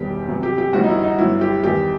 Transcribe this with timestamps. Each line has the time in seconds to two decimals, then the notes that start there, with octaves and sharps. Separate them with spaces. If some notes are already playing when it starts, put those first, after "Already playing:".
Already playing: E1 E2 D#3 G3 G4
0.28 E2 C3 F#3
0.43 G4
0.58 G4
0.73 G1 G2 E3 G3 F#4
0.83 D#4
0.89 E4
1.03 D#4
1.18 G1 G2 F#3 E4
1.41 G4
1.63 E2 D#3 G3 G4